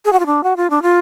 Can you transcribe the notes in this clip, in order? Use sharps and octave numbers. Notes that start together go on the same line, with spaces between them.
G#4
F#4
F4
D4
F#4
F4
D4
F4